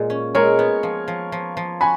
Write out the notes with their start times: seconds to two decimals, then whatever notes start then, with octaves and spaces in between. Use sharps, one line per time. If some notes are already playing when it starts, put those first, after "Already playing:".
Already playing: A#2 G#3 D#4
0.10 C#4
0.35 G#3 A#4 C#5
0.59 B3
0.83 F3
1.08 F3
1.32 F3
1.57 F3
1.81 F#4 G#5 B5